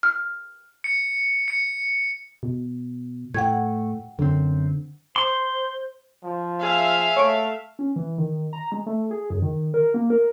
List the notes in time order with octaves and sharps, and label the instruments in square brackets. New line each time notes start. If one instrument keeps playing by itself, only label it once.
[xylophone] F6
[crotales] C#7
C#7
[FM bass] B2
[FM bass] A2 [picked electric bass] A3 [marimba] F#5 G5 G#6
[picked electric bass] F#2 C4 [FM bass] D3
[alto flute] C5 [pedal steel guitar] C6
[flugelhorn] F3
[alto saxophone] G#4 [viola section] E5 F5
[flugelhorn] A3 [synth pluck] C#5 C#6 D7
[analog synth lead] C#4
E3
D#3
A#5
G#3
A3
G#4
F#2
D#3
A#4
A#3
A#4